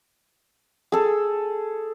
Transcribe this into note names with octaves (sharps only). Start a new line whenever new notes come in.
G#4 A4